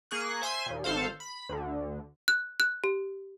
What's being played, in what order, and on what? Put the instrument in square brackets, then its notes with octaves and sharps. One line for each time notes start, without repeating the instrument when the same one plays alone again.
[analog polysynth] A#3 G#4 C#6 F#6
C5 E5 G#5 C6
D#2 A#2
G#1 A4 C5 F5
B5
D2 D3
[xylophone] F#6
F#6
G4